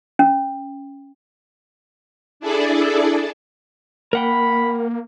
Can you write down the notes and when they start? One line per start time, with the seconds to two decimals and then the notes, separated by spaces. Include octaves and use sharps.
0.19 C#4
2.40 D4 E4 G#4 A4 D5
4.13 A#3 A#4 F#5 G5 B5